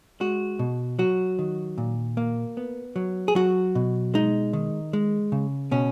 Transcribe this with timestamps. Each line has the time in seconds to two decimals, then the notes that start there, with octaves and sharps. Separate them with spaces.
0.20 G#3 F#4
0.59 B2
0.99 F#3 F#4
1.39 D#3
1.78 A#2
2.17 A#3
2.57 B3
2.96 F#3
3.28 G#4
3.35 F#3 F#4
3.75 B2
4.14 G#3 D#4
4.53 D#3
4.93 G#3
5.32 C#3
5.71 B2 C#4